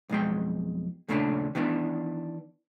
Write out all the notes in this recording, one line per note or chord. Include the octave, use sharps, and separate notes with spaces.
B1 F2 G#3 G5
D#2 A#2 C#3 A3 C#4 D4
D#3 E3 B3 D4